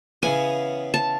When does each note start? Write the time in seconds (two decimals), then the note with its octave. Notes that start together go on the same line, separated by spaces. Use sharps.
0.22 C#3 E3 B3 G#5
0.94 A5